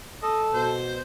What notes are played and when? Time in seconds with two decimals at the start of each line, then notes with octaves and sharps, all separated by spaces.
0.22 A4 D#5
0.54 B2 C5